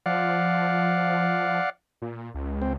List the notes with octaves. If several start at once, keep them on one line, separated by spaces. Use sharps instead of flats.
F3 D5 F5 F#5
A#2
C#2
C4